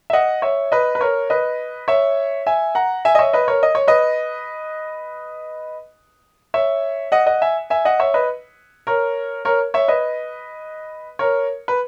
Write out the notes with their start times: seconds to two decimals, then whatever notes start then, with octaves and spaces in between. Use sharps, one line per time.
0.10 E5
0.13 D#5 F#5
0.42 C#5 E5
0.72 B4 D#5
0.95 B4
1.01 A#4 C#5
1.30 B4 D#5
1.88 C#5 E5
2.47 E5 G#5
2.75 F#5 A#5
3.05 E5 G#5
3.15 D#5
3.19 C#5 E5
3.33 B4 D#5
3.48 A#4 C#5
3.63 D#5
3.75 C#5
3.88 B4 D#5
6.54 C#5 E5
7.12 D#5 F#5
7.26 D#5 F#5
7.42 E5 G#5
7.70 E5 G#5
7.85 D#5 F#5
8.00 C#5 E5
8.14 B4 D#5
8.87 A#4 C#5
9.45 A#4 C#5
9.74 C#5 E5
9.88 B4 D#5
11.19 A#4 C#5
11.68 B4